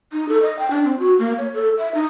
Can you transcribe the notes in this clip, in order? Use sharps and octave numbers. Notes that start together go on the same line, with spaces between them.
D#4
A4
D#5
G5
D4
C4
F#4
A#3
C#5
A4
E5
D#4